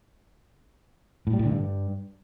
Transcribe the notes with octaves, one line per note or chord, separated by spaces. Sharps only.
A2
G3
A2
D3
G2